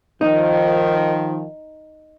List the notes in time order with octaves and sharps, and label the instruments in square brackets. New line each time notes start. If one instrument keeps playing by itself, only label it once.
[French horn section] D#3 F3 [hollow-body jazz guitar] D#4